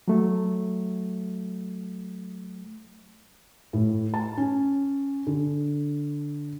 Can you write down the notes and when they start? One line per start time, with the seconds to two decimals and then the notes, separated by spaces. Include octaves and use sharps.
0.08 F#3 A3
3.73 A2
4.14 A5
4.37 C#4
5.27 D3